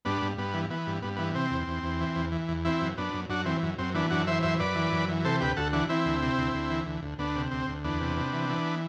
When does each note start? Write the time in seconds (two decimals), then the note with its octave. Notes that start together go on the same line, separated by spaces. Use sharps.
0.05 G2 B3 D4
0.22 G2
0.37 G2 B3
0.54 E3
0.70 E3 B3
0.87 G2
1.02 G2 B3
1.16 E3 B3
1.35 C3 C4
1.51 E2
1.68 E2
1.83 E2
2.01 E3
2.16 E2
2.32 E3
2.48 E2
2.65 E3 C4 E4
2.81 F#2
2.97 F#2 B3 D4
3.14 F#2
3.29 F#2 D4 F#4
3.45 E3 C4
3.63 F#2
3.78 F#2 C4
3.94 E3 B3 D4
4.10 F#2 D4 F#4
4.27 E3 C5 E5
4.43 F#2 C5 E5
4.60 F#2 B4 D5
4.75 E3
4.92 F#2
5.09 E3
5.25 C3 A4 C5
5.40 D2 G4 B4
5.57 D2 F#4 A4
5.73 E3 D4 F#4
5.89 E3 C4 E4
6.05 D2
6.22 C3
6.38 D2
6.54 D2
6.70 E3
6.86 D2
7.02 D2
7.18 D2 B3 D4
7.36 C3
7.51 D2 C4
7.67 D2
7.84 E2 B3 D4
8.01 C3
8.17 C3
8.33 E3
8.49 E3